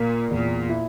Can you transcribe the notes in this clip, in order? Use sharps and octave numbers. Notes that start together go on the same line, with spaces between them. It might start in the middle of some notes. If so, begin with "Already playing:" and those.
Already playing: A#2 A#3
E2 A#2
E4